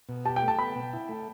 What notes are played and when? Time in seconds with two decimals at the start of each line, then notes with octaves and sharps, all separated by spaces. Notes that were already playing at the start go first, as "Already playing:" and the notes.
0.09 B2
0.25 G4 A5
0.36 G5
0.43 A3
0.48 A5
0.59 B3 B5
0.76 B2
0.93 E4
1.09 A3